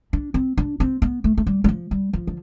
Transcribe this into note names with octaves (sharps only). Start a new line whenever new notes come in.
D4
C4
D4
C4
B3
A3
A3
G3
G3
F3
G3
F3
D3